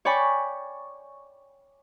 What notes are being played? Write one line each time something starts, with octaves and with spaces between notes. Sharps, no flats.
C#5 D5 G5 G#5 B5 C#6